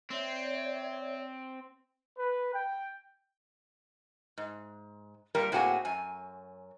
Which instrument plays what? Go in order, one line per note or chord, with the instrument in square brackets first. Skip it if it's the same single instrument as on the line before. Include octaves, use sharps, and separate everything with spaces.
[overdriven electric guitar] C4 [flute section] C#5 D5 E5
[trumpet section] B4
G5
[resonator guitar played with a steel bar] G#2
A#2 G3 A#4
A2 A#3 C4 F#4 G#4 G#5
F#2 G#5